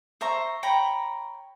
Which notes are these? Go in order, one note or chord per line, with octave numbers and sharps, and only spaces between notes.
C5 E5 A#5 C#6
C#5 G5 A#5 B5